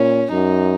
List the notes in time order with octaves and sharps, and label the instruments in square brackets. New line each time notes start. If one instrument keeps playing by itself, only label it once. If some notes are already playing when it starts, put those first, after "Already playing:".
Already playing: [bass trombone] A#2 [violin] C#4
[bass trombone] F#2 [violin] D#4